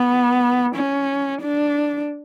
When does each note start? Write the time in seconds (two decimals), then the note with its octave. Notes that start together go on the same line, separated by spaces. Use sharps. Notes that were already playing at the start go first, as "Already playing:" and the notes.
Already playing: B3
0.75 C#4
1.42 D4